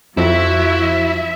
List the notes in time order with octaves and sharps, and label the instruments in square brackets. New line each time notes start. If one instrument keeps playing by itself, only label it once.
[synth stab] F2 [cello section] F3 E5 [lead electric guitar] E4 [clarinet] F#4